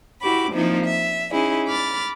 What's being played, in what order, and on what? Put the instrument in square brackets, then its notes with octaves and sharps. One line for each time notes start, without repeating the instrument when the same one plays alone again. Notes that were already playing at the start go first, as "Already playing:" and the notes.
[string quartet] E4 F#4 G4 B5 D6
F3 A#3 C4 D#4 E4
E5
C#4 D#4 E4 G#4
B5 D6 F6 A6